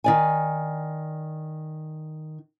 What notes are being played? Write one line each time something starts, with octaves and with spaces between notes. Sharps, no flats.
D#3 D5 G#5